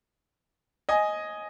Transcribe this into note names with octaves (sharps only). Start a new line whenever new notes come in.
D#5 G#5